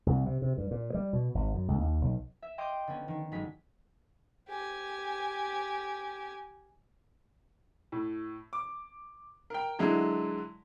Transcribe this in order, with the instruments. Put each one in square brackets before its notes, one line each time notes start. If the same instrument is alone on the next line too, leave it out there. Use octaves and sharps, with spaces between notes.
[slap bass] C2
C3
C3
G2
A#2
G3
B2
G#1
F#2
C#2
D#2
B1
[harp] E5
D#5 F5 G5 C6 D6 G6
D3 B3 C#4
D#3
G1 F#3 G#3 B6
[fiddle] G4 G#5
[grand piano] A2
D6
A#4 G5
D3 F#3 G#3 D4 E4